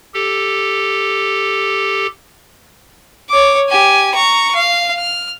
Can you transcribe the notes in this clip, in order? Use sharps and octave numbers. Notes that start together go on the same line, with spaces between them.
G4 A4
C#5 D6
G4 G#5
A#5 C#6
F5
F6